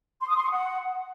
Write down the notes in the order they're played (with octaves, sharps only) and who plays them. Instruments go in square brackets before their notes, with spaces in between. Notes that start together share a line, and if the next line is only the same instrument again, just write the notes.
[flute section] C6
D#6
C6
C#6
F#5